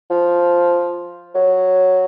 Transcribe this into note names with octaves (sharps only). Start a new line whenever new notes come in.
F3
F#3